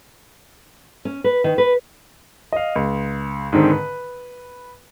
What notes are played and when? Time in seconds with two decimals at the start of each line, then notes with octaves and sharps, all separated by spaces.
1.05 C#4
1.24 B4
1.44 D#3
1.58 B4
2.53 D#5 F5
2.76 C#2
3.52 G#2 D3 D#3 C4
3.71 B4